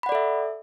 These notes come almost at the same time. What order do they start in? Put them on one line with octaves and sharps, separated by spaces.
B5 F#5 D5 A4 E5